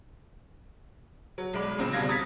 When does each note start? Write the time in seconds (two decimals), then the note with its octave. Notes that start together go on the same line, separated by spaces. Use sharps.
1.38 F#3
1.53 B1 G#3 D5 B5
1.78 A#2 C#3 G#3 C4
1.93 F1 B2 G3 F5 G#6 A#6
2.09 D#6 G#6 A6 B6